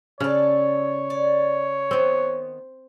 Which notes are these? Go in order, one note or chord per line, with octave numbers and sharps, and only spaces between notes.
C#3 D4 A4 C#5
D5
D#3 B3 C4